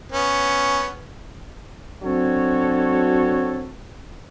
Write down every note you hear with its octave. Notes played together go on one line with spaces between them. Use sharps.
B3 C#4
F#3 C4 D4 F#4 A4 C#5